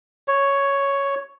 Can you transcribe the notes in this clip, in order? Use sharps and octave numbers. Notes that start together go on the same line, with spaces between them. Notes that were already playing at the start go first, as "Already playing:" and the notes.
C#5